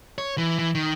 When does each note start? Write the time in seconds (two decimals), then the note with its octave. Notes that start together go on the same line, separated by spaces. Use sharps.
0.18 C#5
0.38 E3
0.59 E3
0.75 D#3